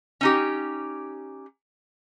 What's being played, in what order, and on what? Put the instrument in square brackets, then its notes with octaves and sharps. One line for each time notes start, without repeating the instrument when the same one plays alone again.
[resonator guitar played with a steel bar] C#4 D#4 G4